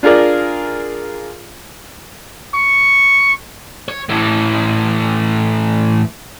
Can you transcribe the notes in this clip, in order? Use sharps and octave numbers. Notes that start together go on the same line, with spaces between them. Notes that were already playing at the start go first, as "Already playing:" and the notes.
D4 F4 G#4 A#4 D5
C#6
C#5
A2 E3